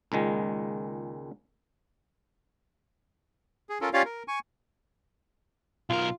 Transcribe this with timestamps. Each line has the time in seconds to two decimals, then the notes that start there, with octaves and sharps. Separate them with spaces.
0.12 C#2 A#2 D#3 G#3
3.69 G#4
3.81 C#4 F4 A4 A#4
3.93 C#4 F4 G4 C#5 D5 F5
4.05 A#4
4.28 G#5 C#6
5.90 B1 F4 A#4